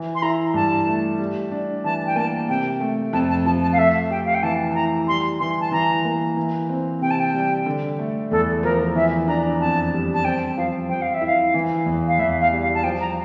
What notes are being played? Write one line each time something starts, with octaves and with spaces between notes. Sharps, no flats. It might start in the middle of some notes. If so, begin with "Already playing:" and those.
Already playing: E3
C6
E4 A#5
G2 A5
A3
G3
D4
E3 A5
G5
A#3 A5
C3 G5
A3
F2 A5
A5
F3 A5
A5
F5
A3 E5
G4 G5
F5
G5
E3 A5
A5
E4 A#5
G3 C6
E3 C6
A5
E3 A#5
A#3
E3
C4
C3 G5
A5
G5
G3
D3
A3
E2 A4
F3 A#4
E3 E5
D4 A#5
F2 A5
G3
A5
C4 G5
F3 F5
F3 G5
F5
E5
E4 F5
E3
E2
F5
E2 E5
F5
G3
F5
A5
F3 G5
A#5